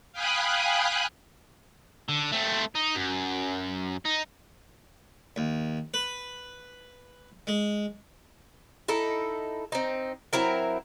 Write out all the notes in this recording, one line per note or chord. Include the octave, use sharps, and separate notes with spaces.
F5 G5 G#5 B5 D#6 F#6
D3
A3 C4
D#4
F#2
D#4
D#2
B4
G#3
D#4 E4 A4
C4 D#4
F#3 C4 E4 A#4